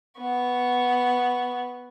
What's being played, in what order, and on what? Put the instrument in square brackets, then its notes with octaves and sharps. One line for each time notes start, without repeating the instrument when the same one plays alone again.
[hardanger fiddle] B3 C#6